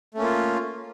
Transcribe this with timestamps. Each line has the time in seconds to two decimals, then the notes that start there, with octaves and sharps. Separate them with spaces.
0.14 A3
0.17 C#4
0.20 A#3
0.23 F4